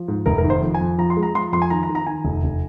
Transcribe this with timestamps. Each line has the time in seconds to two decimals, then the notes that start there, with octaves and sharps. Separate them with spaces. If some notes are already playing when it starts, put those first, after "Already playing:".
Already playing: F3
0.08 G#2
0.26 F1 A#4
0.38 A#4
0.44 D#3
0.50 C5
0.62 F2
0.74 G#5
0.81 F2
0.98 F3 A#5
1.10 C6
1.17 G#3
1.23 A#5
1.34 F3 C6
1.52 F2 C6
1.62 G#5
1.70 D#3 A#5
1.83 A#5
1.89 D#3
1.95 A#5
2.07 D#3 G#5
2.24 F1
2.43 F1